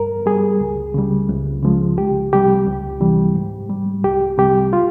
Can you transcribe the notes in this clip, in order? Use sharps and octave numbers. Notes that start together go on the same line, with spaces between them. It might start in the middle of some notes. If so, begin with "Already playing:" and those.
Already playing: G2 A#4
G3 G#4
C#2
C#3 G3
C#2
C#3 F3 G#3
C2 G4
C3 G3 G4
C#2
C3 E3 G3
G#2
G3
C2 G4
C3 G3 G4
F4